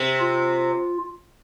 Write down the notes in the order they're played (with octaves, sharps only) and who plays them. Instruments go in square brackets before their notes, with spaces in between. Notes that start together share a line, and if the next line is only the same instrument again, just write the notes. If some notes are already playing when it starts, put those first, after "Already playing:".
Already playing: [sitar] C3 C4
[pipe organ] F4